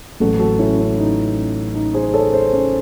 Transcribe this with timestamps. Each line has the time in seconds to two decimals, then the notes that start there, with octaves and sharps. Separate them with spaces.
0.20 A1 A2 F#3 F#4 A4
0.39 F#4 A4
0.59 C#4 E4
0.78 C#4
0.98 D#4
1.75 D#4
1.94 G#4 C5
2.14 A4 C#5
2.33 G#4 C5
2.53 C#4